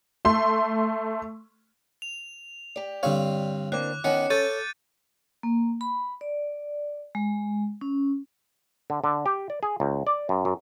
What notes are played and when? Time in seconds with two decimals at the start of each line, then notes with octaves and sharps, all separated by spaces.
0.25 A3 C6
2.02 F7
2.76 G4 D5
3.03 G2 D3 C4 C#5 F5
3.72 A#3 C4 D4 D6 F#6
4.04 D#3 B3 C#4 C#7
4.30 A4 C#5 G6 A6 D#7
5.43 A#3
5.81 B5
6.21 D5
7.15 G#3
7.81 C#4
8.90 D3
9.04 D3
9.26 G4
9.50 D5
9.63 G#4
9.80 C#2
10.07 D5
10.29 F#2
10.45 F#2